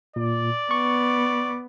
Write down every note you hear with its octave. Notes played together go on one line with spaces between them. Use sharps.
A#2 D5
B3 C#6